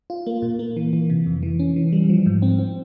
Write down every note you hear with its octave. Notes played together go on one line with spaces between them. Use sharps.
F4
A#3
A#2
A#3
E3
E3
C3
F2
E3
C#4
E3
G3
F3
G#2
C4
C4